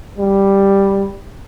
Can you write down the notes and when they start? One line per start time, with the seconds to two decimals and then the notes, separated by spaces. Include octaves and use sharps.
0.18 G3